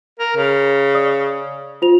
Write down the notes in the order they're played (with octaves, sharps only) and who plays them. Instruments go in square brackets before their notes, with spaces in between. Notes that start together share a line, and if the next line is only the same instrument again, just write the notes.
[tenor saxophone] A#4
C#3
[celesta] D5 D#6
F4 C5 F7